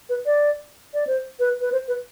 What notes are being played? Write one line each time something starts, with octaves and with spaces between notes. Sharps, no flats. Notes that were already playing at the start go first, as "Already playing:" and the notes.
B4
D5
D5
C5
B4
B4
C5
B4